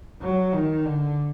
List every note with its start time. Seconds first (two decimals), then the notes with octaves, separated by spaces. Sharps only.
0.22 F#3
0.54 D#3
0.85 D3